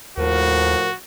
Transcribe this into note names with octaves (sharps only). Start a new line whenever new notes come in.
D#2 A2 F3 F#4 A#4